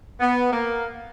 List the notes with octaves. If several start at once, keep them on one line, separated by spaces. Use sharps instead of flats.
B3
A#3